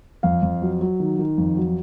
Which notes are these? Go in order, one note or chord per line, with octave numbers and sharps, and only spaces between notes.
F2 F5
F2
F#3
F#3
D#3
D#3
F2
F#3